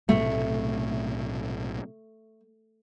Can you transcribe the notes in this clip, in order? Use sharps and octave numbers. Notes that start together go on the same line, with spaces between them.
B1 A2 C3 A3